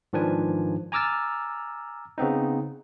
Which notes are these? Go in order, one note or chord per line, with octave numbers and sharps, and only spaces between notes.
G#2 D#3 F3 D4 B4 G#5
G#5 A#5 D6 E6 F6 A6
C#3 B3 C4 D#4